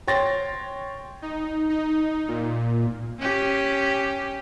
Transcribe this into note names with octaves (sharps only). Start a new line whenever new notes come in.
C#5 G5 C6 A6 A#6
D#4
D#4
A#2
C#4 G4